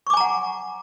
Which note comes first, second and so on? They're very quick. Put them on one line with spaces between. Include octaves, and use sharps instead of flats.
C#6 D6 G#5 A#5 F#5